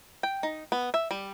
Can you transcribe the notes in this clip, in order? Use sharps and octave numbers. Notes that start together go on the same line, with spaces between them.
G5
D#4
B3
E5
G3